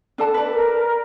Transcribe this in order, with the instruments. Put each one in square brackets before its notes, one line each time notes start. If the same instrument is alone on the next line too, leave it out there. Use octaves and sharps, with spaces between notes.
[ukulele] D4 A4 A5
B4 D5
[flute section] A#4